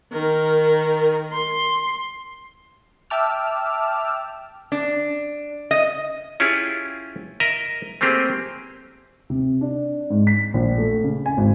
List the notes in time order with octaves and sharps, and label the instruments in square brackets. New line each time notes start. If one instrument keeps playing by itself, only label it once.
[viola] D#3 A#4
C6
[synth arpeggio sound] E5 G5 A5 D6 E6 F6
[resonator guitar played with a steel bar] D4
D#5
[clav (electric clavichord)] C#4 E4 F4 G4 G#4
A#4 D#5 E5 A#5
A3 A#3 C4 G4 G#4
[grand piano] C3
D4
G#2
B6
A#1
A3
C#3
G#5
G#1